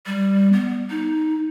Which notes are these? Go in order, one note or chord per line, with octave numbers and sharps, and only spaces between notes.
G3
B3
D#4